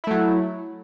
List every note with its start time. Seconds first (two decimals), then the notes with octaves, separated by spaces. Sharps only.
0.04 E4
0.07 A3
0.11 F#3